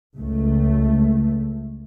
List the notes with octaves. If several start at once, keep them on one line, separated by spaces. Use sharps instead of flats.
C#2 A3